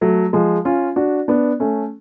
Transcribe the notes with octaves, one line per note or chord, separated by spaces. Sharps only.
F#3 A3
F3 G#3
C#4 F4
D4 F#4
B3 D4
A3 C#4